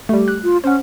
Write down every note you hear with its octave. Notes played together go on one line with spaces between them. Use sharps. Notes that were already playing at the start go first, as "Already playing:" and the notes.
G3 A3 G4
F#6
F4
C#4 C5 F#5